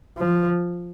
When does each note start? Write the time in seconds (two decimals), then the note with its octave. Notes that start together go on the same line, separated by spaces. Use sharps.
0.18 F3